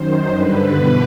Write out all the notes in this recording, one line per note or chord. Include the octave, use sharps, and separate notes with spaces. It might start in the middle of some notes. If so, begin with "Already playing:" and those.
Already playing: F#2 D#3 C5
G2 D3 B4
E2 B2